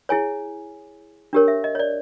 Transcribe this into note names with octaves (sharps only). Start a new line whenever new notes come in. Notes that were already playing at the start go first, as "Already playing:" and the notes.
E4 G#4 C#5 G#5
D4 G4 A#4 C#5
E5
D#5
C#5
D5